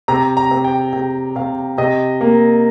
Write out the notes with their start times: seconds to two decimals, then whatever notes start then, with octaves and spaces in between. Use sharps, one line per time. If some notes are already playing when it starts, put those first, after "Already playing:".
0.08 C3 A#5
0.37 A#5
0.51 C3
0.64 G5
0.93 C3 G5
1.36 C3 F5
1.78 C3 D#5
2.21 A#3